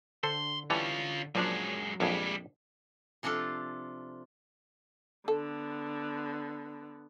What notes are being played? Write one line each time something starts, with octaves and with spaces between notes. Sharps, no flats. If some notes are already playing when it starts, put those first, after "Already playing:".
D3 A4 C5 C6
E3 G3 C#4 F4 A5
F#2 A#2 F3 F#3 G#3 D4
A#1 F2 G3 G#3 G#4
C3 F3 D4 F4 A4
D3 B3 A4